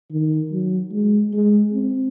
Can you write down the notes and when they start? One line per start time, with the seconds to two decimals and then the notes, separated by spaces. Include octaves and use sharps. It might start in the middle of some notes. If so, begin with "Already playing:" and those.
0.12 D#3
0.52 F#3
0.92 G#3
1.32 G#3
1.72 C4